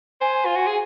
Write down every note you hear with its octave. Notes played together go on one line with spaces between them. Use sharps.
C5 G#5
F4
F#4
G#4